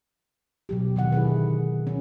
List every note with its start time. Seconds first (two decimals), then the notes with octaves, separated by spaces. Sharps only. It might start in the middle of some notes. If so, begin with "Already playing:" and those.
0.69 B2 F#3 G4
0.96 D3 D#3 F#5
1.12 E4 G#4 B4
1.87 C#4